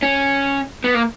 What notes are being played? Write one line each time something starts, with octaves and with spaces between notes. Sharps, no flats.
C#4
B3
A#3